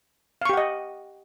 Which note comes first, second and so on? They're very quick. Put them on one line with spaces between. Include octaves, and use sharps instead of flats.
F5 C#6 G4 F#5 D#5